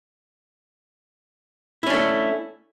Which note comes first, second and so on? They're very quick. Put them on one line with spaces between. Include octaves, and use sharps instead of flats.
E4 C#4 D4 A3